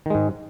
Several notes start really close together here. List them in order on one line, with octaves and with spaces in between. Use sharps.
D#3 G#3 G#2